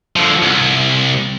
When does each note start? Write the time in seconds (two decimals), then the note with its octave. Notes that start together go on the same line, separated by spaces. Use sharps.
0.16 D3 F3
0.42 C2